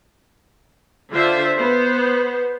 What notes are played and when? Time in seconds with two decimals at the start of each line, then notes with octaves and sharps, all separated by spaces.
1.11 D3 F4 C5 E5
1.56 B3 C5